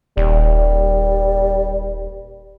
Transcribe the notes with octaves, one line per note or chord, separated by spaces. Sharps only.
D#1 G3